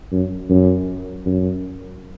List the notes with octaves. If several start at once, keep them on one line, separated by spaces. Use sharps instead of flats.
F#2
F#2
F#2